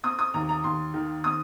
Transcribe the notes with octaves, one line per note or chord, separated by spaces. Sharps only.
C4 D#6
D#6
D#2 A#5
A#5
D#2 C6
D#3
C4 D#6